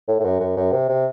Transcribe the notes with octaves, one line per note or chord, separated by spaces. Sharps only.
A2
A2
F#2
F#2
F#2
C3
C3